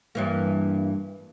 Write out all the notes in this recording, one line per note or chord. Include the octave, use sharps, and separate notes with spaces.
G2 E3 A#3